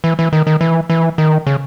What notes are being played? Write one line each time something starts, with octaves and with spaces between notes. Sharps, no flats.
E3
E3
D#3
D#3
E3
E3
D#3
C#3